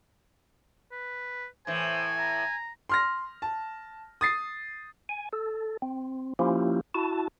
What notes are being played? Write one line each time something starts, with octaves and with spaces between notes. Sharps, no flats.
B4
A2 E3 C5 G#5
A#5
C6 F6 A#6
A5
D#6 A6 C7
G#5
A4
C4
F3 A#3 C#4 E4 F4 G4
E4 F#4 A5